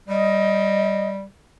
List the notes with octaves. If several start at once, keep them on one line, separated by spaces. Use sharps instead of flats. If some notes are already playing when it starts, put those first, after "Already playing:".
G3 D#5